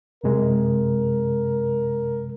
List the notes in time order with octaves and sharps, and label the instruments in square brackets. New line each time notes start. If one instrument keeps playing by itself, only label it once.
[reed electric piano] F#2 C3 G#3 [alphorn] A#4